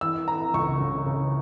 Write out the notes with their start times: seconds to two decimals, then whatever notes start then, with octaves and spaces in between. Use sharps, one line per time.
0.01 E3 E6
0.28 E3 A#5
0.54 C#2 C#6
0.81 C#3
1.06 C#3